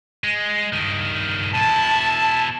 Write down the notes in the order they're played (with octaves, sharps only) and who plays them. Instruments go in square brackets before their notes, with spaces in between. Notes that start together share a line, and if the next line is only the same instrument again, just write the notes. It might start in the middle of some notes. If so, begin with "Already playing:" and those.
[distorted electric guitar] G#3
G2 D#3
[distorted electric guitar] B2 E4 [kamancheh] A5